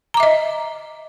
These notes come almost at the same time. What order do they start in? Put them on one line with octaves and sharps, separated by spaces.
A#5 D6 E5 D#5